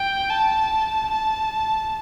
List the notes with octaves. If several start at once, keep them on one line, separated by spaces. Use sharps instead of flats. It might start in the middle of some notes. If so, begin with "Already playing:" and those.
Already playing: G5
A5
A5